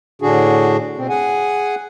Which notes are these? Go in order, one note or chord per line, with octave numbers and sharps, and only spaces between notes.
A2 D3 D4 F#4 G#4
B2 C4
G#4 F#5 G#5